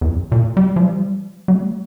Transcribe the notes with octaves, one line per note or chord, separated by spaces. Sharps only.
E2
F2
A#2
G3
F3
G3
G3
A3